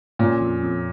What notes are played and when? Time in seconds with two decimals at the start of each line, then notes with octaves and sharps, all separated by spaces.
0.19 A#2 C#4
0.41 F2
0.62 F2